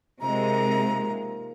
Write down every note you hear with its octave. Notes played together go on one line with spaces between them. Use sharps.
C3 D#3 F3 G#3 C4 A#5
A#3